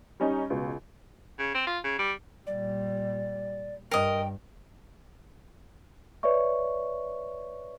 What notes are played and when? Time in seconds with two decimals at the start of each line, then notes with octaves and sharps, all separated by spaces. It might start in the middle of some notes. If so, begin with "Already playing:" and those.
0.20 G3 C#4 D#4
0.50 C#2 B2
1.39 C#3
1.55 C4
1.67 F4
1.84 C#3
1.99 G3
2.47 A#2 G3 D5
3.91 G2 A#4 D#5 G5
6.23 B4 C#5 D5 E5 C#6